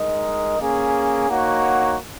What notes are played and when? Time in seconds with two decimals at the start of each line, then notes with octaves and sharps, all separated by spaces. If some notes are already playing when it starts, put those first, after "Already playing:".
Already playing: G#3 D#4 A#4 D#5
0.58 A#3 C#4 G#4
1.28 A#3 D#4 F#4 C#5 F#5